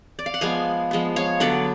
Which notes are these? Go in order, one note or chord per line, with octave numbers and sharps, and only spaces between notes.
D5
F5
F#5
F3 G#3 B3 F5 G#5
F3 G#3 B3
C#5 F5
D3 F#3 B3 B4 D5